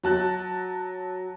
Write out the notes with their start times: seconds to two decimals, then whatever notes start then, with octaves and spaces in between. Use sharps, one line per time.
0.03 F#3 A5 F#6